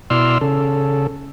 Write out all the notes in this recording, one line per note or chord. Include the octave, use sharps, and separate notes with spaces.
B2 E4 D5 C6 E6 F6
C#3 A4